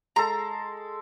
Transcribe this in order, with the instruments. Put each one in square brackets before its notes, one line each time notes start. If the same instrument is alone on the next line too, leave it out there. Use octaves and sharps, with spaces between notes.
[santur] G#3 A4 [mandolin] A#5